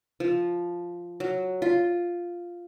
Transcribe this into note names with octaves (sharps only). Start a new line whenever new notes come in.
F3
F#3
F4